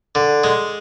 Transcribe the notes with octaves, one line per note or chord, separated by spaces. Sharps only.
D3
G#3